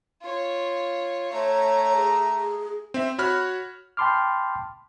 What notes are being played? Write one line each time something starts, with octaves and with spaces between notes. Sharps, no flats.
F4 C#5
A3 C#5 A#5
G#4
G#4
C4 E5
F#4 C#5 B5 F6 F#6
G5 A5 B5 C6 D6 F6